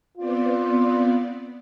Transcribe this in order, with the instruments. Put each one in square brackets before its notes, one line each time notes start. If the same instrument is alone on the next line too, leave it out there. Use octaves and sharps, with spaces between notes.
[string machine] B3 C4 D5 [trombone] F4